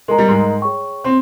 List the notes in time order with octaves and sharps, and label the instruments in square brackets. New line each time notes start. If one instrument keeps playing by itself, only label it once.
[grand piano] G#3 [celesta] A#4 D#5 A#5
[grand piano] G3
G#2 G#3
[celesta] G#4 C#5 G5 C#6
[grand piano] C4